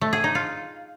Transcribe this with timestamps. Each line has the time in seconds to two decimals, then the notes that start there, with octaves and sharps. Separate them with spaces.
0.01 A3
0.13 G#4
0.24 D#4
0.35 F4